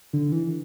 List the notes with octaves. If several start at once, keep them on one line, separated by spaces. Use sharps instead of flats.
D3
E3